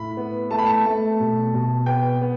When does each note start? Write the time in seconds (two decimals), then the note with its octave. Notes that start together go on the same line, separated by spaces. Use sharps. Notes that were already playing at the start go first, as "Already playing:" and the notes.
Already playing: A2 B5
0.17 B3
0.51 A3 A5
0.58 B5
0.66 A5
0.85 A3
1.19 B2
1.54 B2
1.86 B3 G5
2.21 B3